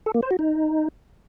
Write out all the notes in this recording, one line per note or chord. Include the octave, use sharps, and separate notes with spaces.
A4
A#3
C5
F#4
D#4